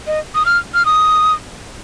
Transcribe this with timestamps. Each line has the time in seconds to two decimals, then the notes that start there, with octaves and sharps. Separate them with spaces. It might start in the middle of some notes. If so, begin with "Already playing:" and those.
0.07 D#5
0.35 D#6
0.46 F6
0.74 F6
0.86 D#6